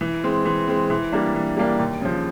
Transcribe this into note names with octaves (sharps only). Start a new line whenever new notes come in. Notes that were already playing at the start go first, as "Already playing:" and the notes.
E3
G#3 C4
E3
G#3 C4
E3
G3 A#3 D4
E3
G3 A#3 D4
D#2
C#3 F3